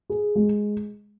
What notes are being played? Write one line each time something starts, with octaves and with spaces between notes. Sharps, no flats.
G#4
G#3